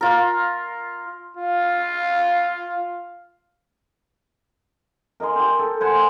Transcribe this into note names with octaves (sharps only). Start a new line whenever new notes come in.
F4 A#4
F4 F5
A#4 D#5 G#5 C6
G4 G5
A4
C5 F#5 G#5